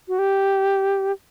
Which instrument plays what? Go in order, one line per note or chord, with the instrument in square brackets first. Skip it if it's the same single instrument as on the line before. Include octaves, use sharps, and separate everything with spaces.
[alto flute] F#4
G4